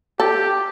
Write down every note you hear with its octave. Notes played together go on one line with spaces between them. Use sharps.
G4 A4